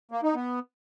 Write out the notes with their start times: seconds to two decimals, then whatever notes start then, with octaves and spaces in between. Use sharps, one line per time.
0.12 A#3
0.23 D#4
0.35 B3